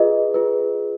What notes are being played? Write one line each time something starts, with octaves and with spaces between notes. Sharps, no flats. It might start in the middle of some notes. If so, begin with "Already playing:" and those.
Already playing: F4 G#4 B4 D#5
F4 G#4 B4